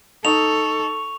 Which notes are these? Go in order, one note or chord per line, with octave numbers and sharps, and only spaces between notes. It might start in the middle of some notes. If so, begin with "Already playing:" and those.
D#4 A4 C#6 F7